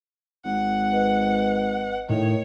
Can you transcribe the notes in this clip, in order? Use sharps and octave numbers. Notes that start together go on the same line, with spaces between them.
G#1 F#5
B4 D#5
A2 D#3 C#5